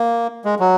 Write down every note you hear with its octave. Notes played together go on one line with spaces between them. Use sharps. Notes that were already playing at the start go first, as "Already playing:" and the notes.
Already playing: A#3
G#3
F#3